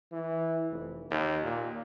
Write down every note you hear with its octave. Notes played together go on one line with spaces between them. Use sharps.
E3
F1
D#2
A#2